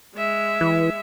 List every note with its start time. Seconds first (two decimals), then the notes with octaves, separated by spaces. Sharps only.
0.15 G#3 E5
0.61 E3